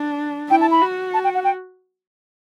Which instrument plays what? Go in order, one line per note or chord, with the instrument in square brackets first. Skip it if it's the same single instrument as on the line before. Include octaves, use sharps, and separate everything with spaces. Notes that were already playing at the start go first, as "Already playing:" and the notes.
Already playing: [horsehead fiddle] D4
[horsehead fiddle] E4 [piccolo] G5
[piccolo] A5
B5
[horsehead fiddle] F#4
[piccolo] A5
G5
F#5
G5